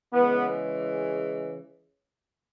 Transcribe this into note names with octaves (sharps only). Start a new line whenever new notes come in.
C#3 E3 G#3 B3